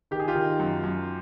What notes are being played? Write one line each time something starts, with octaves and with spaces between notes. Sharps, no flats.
D#3 G4
G#4
F4 G4
D#3
F#2
F#2